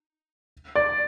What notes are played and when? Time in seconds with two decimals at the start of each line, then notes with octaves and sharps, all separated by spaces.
0.75 D5